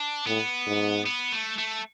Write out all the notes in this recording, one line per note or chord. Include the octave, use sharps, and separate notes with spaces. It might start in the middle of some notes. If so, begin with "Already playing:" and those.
Already playing: D4
A2 B3
G#2
B3
A3
A3